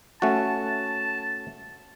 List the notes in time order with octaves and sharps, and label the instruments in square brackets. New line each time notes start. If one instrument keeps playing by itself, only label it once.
[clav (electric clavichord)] A3 C#4 F#4 [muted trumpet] A5